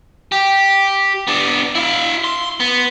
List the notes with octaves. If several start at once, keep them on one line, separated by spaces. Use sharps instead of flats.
G4
B3 D4
E4 F5
C6
B3